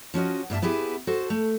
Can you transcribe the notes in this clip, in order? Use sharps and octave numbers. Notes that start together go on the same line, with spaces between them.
F3 C#4 F#4 D#5
G2 A#3 E5 A5
B3 E4 G4 G#4 B4
F#4 A4 C5
A3